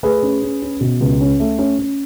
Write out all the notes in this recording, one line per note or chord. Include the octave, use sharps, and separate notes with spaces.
A3 G#4 B4
C#4
C#4
C#4
B2
C#2
C#4
A3
C#4
C#4